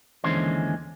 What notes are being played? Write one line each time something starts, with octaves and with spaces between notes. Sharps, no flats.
D#2 D3 E3 G#3 C#4 C5